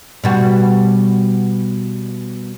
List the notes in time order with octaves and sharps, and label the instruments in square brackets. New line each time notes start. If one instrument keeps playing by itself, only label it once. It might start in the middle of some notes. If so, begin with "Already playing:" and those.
[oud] B2 G3 F#4